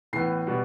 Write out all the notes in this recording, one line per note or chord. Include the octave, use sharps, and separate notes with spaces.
A2 E3 B3 C7
B2 G3 B3